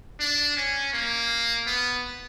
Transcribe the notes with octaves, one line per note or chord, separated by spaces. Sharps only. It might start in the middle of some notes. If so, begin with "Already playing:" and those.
D4
C#4
A#3
B3